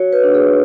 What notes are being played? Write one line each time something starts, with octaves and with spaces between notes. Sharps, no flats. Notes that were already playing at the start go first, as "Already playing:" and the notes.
Already playing: F#4 C#5
B4
D4
G#4